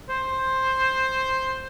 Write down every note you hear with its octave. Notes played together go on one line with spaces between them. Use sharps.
C5